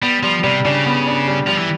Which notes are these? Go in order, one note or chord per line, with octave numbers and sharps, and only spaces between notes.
G3 B3
F3 G3
C3 G3
C#3 D4
B3
D4
G3
F3 G3
E3